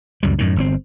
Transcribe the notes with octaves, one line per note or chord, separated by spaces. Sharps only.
C#2 F#2 G3
F#2 A2 D#3
G1 D3 C4